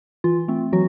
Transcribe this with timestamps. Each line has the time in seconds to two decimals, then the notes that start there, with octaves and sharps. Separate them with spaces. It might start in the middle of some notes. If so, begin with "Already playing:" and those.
0.24 E3 F4
0.48 A3 C4
0.72 E3 F#3 F#4